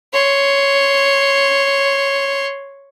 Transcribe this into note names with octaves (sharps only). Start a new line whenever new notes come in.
C#5 C6